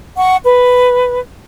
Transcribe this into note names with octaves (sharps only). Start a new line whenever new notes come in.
F#5 C#6
B4